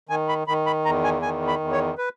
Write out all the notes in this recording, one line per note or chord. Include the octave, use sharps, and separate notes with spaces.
D#3 G#5
B5
D#3 B5
B5
E2 A#5
G#5
D#3 G#5
B5
E2
C#5
B4